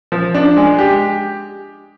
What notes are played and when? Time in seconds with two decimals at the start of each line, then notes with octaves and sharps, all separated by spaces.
0.12 F3
0.35 D4
0.57 G#3
0.79 G4